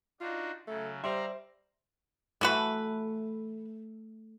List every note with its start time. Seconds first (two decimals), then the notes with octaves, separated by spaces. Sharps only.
0.21 D4 D#4 F4 F#4
0.68 C#3 F#3 A3
1.04 G3 C5 D5 E5 F5 A#5 C6
2.41 E3 A3 F#4 B4